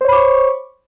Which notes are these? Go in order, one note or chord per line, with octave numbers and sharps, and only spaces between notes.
C5 C#5 B5 C#6 D6